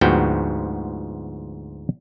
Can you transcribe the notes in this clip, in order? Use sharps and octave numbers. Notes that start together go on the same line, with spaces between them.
D2 G#2 F3 B3 F#4 G5